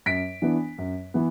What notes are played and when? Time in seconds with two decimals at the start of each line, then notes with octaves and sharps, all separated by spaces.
0.06 F#2 B6 D7
0.42 E3 B3 D4
0.78 F#2
1.14 E3 B3